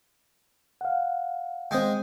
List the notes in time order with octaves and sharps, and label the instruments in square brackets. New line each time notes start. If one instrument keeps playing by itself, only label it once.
[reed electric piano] F5 F#5
[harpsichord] G#3 G#4 [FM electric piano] C4 G5